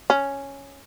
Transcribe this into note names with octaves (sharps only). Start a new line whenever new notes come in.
C#4